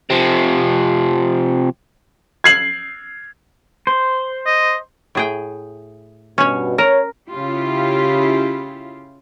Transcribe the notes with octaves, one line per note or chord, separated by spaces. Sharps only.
C3 F3
G#6 C7 F#7
C5
D#5
A2 G#4 G5
G2 B2 C#4 C#5
A#4 C#5
C#3 E4 F4 G4